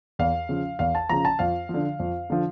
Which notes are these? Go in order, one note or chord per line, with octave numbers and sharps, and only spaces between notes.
E2 F5
C#3 F3
E2 F5
A5
C#3 F3 A#5
A5
F2 F5
D3 F3
F2
D3 F3